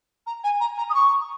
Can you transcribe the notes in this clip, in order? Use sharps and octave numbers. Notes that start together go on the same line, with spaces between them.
A#5
G#5
A#5
A#5
D#6
C#6